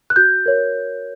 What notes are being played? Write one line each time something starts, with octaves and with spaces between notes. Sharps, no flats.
F#6
F#4 G6
A#4 C#5